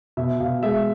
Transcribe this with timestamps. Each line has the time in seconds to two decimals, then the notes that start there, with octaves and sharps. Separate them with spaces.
0.17 B2 E5
0.40 B2 F5
0.63 G#3 E5